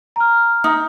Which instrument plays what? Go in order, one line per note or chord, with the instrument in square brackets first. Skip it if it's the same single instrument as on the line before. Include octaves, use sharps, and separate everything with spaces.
[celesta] A#5 F6
[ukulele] D#4